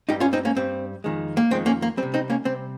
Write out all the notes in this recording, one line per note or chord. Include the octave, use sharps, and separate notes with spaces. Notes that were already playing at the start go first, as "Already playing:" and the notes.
G2 G3 D#4 G4
C#4 F4
C4 D#4
A#3 C#4
G2 G3 C4
F2 D#3 G#3
A#3
F2 D#3 G#3 C4
A#3 C#4
A#3
G3 C4
C3
C4 D#4
A#3 C#4
C3 G3 C4